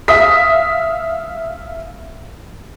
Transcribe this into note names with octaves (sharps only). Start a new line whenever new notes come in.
E5 F5 D#6 B6